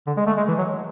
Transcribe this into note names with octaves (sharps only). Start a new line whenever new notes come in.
D3
G#3
A3
G#3
E3
F#3